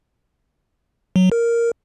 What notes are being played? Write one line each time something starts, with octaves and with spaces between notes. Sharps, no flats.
F#3
A#4